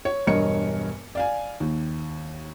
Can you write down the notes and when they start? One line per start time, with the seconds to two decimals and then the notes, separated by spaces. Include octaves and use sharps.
0.05 C#5
0.27 E1 G2 A#4 C#5 D#5 C#7
1.15 D5 F5 G#5
1.60 D#2